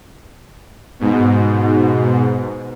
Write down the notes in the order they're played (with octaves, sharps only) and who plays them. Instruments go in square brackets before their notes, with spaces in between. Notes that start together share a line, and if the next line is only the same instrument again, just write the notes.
[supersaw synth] G#2 B2